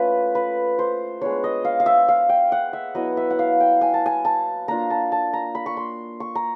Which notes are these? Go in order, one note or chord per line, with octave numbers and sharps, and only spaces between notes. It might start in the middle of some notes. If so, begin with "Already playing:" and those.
Already playing: A3 C#4 F4 B4
B4
C5
G#3 B3 D4 C#5
D#5
F5
F5
E5
F5
G5
F#5
E5
F#3 B3 E4 D#5
E5
F#5
F5
G5
G#5
A5
G#5
A5
A#3 D4 F4 A#5
A5
A5
A#5
B5
C#6
C6
C#6
A#5